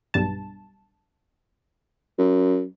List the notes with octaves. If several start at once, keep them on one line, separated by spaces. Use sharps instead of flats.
B1 G2 A5
F#2